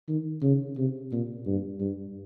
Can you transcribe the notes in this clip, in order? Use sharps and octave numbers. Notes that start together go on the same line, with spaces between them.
D#3
C#3
C3
A#2
G2
G2